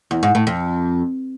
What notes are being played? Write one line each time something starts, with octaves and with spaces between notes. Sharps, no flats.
E2
G#2
A2
F2